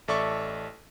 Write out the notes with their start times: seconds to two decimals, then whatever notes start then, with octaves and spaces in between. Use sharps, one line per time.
0.08 A1 A4 D5 E5 C#6